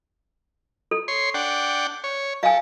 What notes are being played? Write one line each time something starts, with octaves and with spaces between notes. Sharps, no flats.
A4
C#5 C6
D4 F#5 G5
C#5
A4 F5 G#5